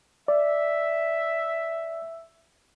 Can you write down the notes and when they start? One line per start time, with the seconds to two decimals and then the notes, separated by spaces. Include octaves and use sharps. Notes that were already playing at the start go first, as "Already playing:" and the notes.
0.28 D5 E5